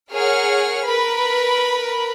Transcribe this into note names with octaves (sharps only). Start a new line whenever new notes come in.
G#4 A#4 C#5 F#5 F6
A#4 B4 B5